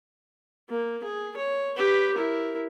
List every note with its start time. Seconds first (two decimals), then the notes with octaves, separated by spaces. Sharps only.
0.69 A#3
1.04 G#4
1.37 C#5
1.76 G4 B4
2.15 E4 A#4